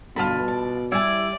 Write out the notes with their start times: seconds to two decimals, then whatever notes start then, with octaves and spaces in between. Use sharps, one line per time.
0.16 G2 B2 D3 F4 A5 B5
0.48 D5
0.92 G3 E4 D5 G#5